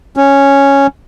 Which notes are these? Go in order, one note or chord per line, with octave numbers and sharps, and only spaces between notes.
C#4